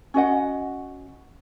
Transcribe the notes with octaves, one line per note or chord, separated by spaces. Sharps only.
C#4 F#4 D#5 F#5